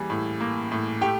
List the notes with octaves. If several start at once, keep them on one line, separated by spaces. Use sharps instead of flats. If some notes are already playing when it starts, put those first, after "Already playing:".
Already playing: E3 G3 A#3 G#4 G#5
A2
A#3
A2
A3 G4 G5